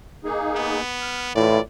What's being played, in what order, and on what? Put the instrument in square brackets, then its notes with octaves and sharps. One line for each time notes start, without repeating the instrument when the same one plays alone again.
[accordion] A#3 D#4 G#4
[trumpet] B3
[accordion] F6
[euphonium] A2 [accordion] E3 E4 F4 [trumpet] D5